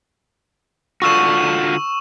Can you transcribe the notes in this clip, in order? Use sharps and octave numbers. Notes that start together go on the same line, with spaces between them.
D3 F4 F#4 C#6 E6 E7